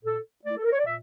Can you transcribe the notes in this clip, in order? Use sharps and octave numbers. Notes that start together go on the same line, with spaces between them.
A#2 A4
A3 E4 D5
A4
A#4
C#5
D5
A#2 E5